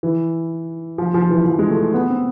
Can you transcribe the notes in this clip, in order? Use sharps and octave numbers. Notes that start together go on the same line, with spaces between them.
E3
F3
F3
E3
F3
G#3
A3
B3
C4